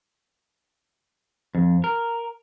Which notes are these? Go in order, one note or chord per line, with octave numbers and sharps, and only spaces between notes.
F2
A#4